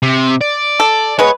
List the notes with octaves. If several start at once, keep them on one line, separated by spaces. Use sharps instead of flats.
C3
D5
A4
G#3 B3 B4 C#5